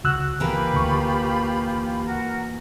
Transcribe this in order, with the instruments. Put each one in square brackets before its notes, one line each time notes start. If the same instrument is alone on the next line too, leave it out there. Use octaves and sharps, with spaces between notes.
[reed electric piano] C#2 E6 F#6 [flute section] F#4
[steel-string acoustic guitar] E3 A#3 B4 [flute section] F4 G4 B5
[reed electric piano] D2 C#6
[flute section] F#4 A#4